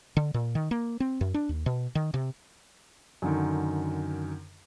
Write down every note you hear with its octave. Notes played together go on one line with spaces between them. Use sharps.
D3
A#2
D#3
A#3
C4
F#2
D4
D#2
B2
D#3
C3
F#2 D3 D#3